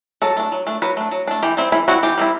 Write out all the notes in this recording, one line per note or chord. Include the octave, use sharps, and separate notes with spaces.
F#3 A4
A3 D4
F#3
A3 D4
F#3 B4
A3 D4
F#3
A3 D4
E3 G4
G3 C4 E4
E3 E4
G3 C4 E4 F#4
E3 G4
G3 C4 E4